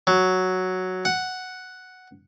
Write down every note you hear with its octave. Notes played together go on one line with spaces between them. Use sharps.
F#3
F#5